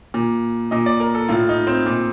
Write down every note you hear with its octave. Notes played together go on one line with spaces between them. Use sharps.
A#2
A#2 D#5
D5
A#4
A4
A2 F4
D#4
C4
A#2